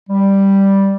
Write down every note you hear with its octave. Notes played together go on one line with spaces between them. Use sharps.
G3